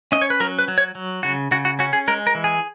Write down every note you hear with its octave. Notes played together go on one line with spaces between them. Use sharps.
C#4 D#5
C#5
B4
F#3 A#4
B4
F#3
C#5
F#3
C#3 F#4
C#3 F#4
F#4
C#4 F#4
G#4
G#3 A#4
A#4
E3
G#4